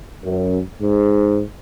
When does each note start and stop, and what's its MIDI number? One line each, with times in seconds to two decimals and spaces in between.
0.24 0.58 42
0.81 1.41 44